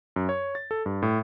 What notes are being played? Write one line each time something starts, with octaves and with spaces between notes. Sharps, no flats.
F#2
C#5
A6
A4
G2
A2